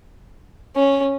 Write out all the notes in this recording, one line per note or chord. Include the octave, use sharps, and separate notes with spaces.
C#4